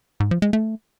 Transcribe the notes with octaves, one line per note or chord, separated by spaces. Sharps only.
G#2
F3
G#3
A3